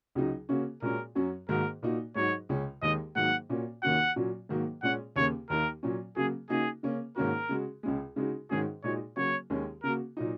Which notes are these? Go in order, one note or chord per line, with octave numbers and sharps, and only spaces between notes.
C#2 C#3 F#3 D#4 F#4
C#3 A#3 C#4 F#4
A#2 G#3 C#4 F#4 A#4
F#2 F#3 C#4 F#4
G#2 D#3 A#3 F#4 A#4
A#2 A#3 D#4 F#4
G#2 F#3 D#4 F#4 C#5
C#2 C#3 G#3 C#4
D#2 D#3 G#3 D#4 D#5
G#2 D#3 F#3 A#3 F#5
A#2 A#3 C#4 F#4
D#2 D#3 A#3 C#4 F#4 F#5
A#2 F#3 C#4 F#4
G#2 D#3 F#3 A#3 F#4
A#2 G#3 C#4 F#5
D#2 C#3 A#3 C#5
D#2 D#3 A#3 D#4 A#4
A#2 F#3 C#4
C#3 F#3 A#3 F#4 G#4
C#3 A#3 D#4 F#4 G#4
C#3 A#3 C#4
G#2 D#3 A#3 C#4 F#4 A#4
C#3 G#3 F#4
C#2 C#3 G#3
C#3 G#3 D#4 F#4
G#2 D#3 G#3 C#4 F#4 G#4
A#2 G#3 D#4 F#4 C#5
C#3 F#3 A#3 F#4 C#5
D#2 D#3 G#3 C#4
C#3 A#3 F#4 A#4
A#2 F#3 D#4